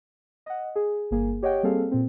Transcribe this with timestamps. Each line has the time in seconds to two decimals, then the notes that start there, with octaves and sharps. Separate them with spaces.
0.46 D#5 F#5
0.76 G#4
1.11 G1 A#3 G#4
1.42 G4 C#5 D#5 F#5 G5
1.63 G3 A#3 C4 G#4 A4 F5
1.92 A#2 C4